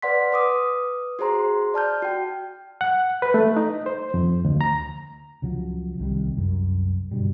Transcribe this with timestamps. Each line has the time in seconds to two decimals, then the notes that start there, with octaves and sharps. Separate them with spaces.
0.02 B4 D5 F#5 C6 B6
0.32 B4 D6 D#6
1.19 F#4 G#4 C5 A#5 C6
1.74 D5 A5 F6 G6
2.02 F#4 G5
2.81 F#5
3.22 B4
3.34 A3
3.57 D#4
3.86 C5
4.14 F2
4.44 D2
4.61 A#5
5.42 C#2 C#3 F3 F#3
5.99 C2 D#3 G3
6.35 C2 F#2
7.11 G2 B2 D3 G3